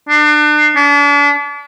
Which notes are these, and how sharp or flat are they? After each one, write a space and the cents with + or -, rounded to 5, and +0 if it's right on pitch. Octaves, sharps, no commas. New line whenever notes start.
D4 +35
D4 -40